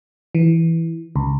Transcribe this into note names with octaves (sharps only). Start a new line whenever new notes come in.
E3
C#2